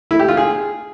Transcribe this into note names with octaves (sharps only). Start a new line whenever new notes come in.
E4
G4
F4
G#4